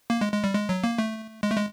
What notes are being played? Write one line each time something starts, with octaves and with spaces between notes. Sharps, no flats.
A#3
G#3
G#3
G3
G#3
F#3
A#3
A3
G#3
A3
G#3